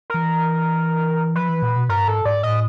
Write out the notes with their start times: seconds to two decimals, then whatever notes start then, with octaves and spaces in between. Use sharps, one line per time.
0.10 E3 A#4
1.35 F3 B4
1.49 E3
1.62 A#2
1.76 B2
1.89 G2 A#4
2.07 G#2 A4
2.25 G#2 D5
2.43 A2 D#5